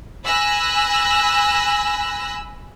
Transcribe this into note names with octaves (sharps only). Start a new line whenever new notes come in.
G#5 B5 E6 F#6 A#6